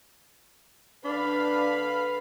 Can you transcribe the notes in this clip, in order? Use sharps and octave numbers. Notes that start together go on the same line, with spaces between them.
D3 D4 B4 F5 B5